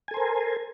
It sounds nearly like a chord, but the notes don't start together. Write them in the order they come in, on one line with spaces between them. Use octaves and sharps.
G#5 A4 C5 A#4